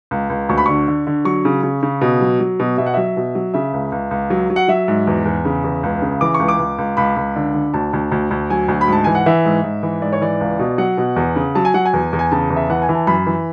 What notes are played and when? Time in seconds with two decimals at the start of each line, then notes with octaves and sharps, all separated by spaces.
0.11 C#2
0.30 C#2
0.49 D2 C#6
0.58 B5
0.66 D3 C#6
0.88 D3
1.07 D3
1.25 F#3 C#6
1.45 C#3
1.63 C#3
1.83 C#3
2.01 B2
2.21 F#3
2.40 F#3
2.60 B2
2.78 B2 E5
2.86 F#5
2.94 F#3 E5
3.17 B2
3.35 F#3
3.54 C#3 E5
3.73 C#2
3.92 C#2
4.11 C#2
4.30 F#3
4.50 F#3
4.56 F#5
4.68 F#3 E5
4.88 G#2
5.07 E2
5.25 E2
5.45 C#3
5.64 E2
5.83 C#2
6.02 C#3
6.21 E3 D6
6.34 C#6
6.40 C#2
6.48 D6
6.59 C#2
6.78 C#2
6.97 C#2 B5
7.16 C#2
7.36 D3
7.54 D3
7.74 D2 A5
7.93 D2
8.12 D2
8.31 D2
8.50 F#3 G#5
8.68 D2
8.81 B5
8.88 G#2 A5
9.04 E3 G#5
9.15 F#5
9.26 E3 E5
9.45 G#2
9.64 G#2
9.83 E3
10.02 G#2 D5
10.13 C#5
10.22 E3 D5
10.40 C#2
10.59 B2
10.78 F#3 F#5
10.97 B2
11.16 E2
11.36 C#3
11.55 F#3 A5
11.65 G#5
11.74 F#3 F#5
11.85 G#5
11.93 E2
12.13 E2
12.19 G#5
12.32 C#3 A5
12.50 E2
12.56 E5
12.70 E3 F#5
12.82 G#5
12.89 E3
12.95 A5
13.07 F#2 B5
13.27 E3